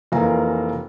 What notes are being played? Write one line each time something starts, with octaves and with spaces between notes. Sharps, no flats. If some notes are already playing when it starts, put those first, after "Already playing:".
F1 E3 A#3 F4 F5 A#5